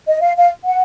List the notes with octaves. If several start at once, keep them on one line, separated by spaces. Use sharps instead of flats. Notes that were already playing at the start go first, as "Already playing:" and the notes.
D#5
F5
F5
F#5